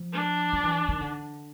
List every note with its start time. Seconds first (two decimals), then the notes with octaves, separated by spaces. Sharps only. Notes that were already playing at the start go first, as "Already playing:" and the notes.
Already playing: F3
0.13 D4
0.53 F3
0.64 E3
0.88 D#3
1.01 D3